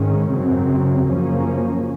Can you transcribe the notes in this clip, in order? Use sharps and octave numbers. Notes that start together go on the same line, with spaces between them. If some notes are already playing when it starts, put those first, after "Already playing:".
Already playing: G#2 D#3 G#3 C#4
F#2 C#3 F#3 C4
F#2 C#3 F3 A#3 C#4